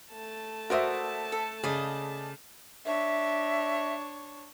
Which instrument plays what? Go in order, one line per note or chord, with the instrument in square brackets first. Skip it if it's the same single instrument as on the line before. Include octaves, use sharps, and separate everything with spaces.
[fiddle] A3 A5
[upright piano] F#4 C5 E5 [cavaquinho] A#4 D5 D#6
[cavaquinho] A4
[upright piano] C#3 [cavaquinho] G#4 D5 D#5
[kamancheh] D4 C#5 [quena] E5